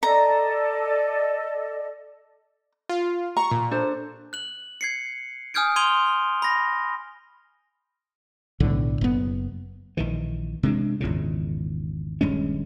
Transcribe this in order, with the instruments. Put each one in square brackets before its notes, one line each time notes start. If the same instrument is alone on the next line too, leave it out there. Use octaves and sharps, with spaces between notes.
[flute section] A4 D5 D#5 [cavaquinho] A#5
[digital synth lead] F4
[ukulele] A#5 [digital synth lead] C#6
[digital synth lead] A#2
[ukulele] D4 A4 C5
[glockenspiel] F#6 F#7
G#6 C7 C#7
G#5 D#6 F6 G6 G#6 D7
C6 D#6 G#6 D#7 F7 G7
B5 A#6
[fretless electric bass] B1 A2 D3
F#1 B3
[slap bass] A#1 D#3 E3
C3 G#3 D4
G#1 E2 A#2 C#3
D#1 G2 G#3 C#4